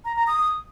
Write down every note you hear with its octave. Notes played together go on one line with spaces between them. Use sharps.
A#5
A#5
D#6